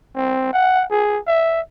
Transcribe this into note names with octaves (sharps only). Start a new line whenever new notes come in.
C4
F#5
G#4
E5